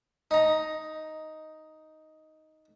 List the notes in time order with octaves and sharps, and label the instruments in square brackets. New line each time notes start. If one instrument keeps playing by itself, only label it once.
[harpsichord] D#4 A#5